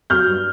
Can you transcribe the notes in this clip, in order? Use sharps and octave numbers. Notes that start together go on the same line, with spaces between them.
F#3 F6 G6
G2